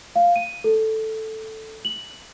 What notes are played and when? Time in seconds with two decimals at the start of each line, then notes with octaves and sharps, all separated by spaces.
0.16 F5
0.36 D#7
0.64 A4
1.85 F#7